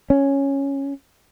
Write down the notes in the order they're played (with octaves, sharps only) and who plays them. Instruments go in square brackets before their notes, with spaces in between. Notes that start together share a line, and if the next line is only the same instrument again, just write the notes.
[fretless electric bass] C#4